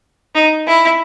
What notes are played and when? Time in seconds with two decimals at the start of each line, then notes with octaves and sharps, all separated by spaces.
0.35 D#4
0.67 E4